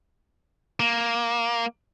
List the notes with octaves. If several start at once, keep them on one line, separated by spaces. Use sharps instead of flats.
A#3